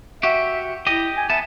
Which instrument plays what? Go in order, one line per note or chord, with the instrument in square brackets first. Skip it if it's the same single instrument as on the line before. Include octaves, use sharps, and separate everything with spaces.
[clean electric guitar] F#4 G4 [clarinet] E5
[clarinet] E4 [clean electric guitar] G4 D#5
[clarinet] G#5
[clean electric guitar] B3 A5 [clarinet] E5